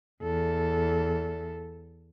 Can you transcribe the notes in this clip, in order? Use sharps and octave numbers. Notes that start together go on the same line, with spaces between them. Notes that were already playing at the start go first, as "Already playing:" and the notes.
E2 A4